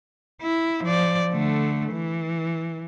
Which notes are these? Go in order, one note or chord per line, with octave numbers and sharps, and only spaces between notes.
E4
F3 D5
D3 A3
E3